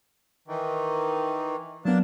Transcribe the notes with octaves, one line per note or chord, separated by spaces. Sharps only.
D#3 E3
F#3 A#3 B3 D4 A5